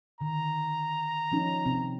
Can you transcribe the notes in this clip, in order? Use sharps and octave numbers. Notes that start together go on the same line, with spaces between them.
D3 D#3 A#5
F3 C#4 D#4
C3 C4